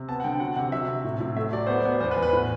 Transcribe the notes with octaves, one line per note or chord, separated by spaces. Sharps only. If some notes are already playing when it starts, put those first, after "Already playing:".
Already playing: C3
B3 A5
F#5
D3 G5
F#3 F#5
C3 F#5
F#3 E5
C3
A2
A2
A3 E5
F#3 D5
B3 C5
D5
B3
E2 C5
B4
E2
B4
A2